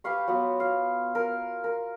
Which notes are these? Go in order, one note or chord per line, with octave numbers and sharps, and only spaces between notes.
G4 B4 F5 C#6
F#3 B3 F4
F5
A#4
A#4